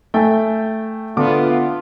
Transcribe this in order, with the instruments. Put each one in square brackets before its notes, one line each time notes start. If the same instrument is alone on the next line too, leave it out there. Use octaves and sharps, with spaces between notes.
[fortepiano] A3 [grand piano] G5 G#5
[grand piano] D3 F#5 D6 [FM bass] B3 [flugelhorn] F4